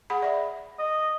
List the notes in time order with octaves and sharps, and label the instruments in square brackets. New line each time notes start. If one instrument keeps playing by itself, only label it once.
[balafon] G#4 F#5 B5
D5 E5
[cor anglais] D#5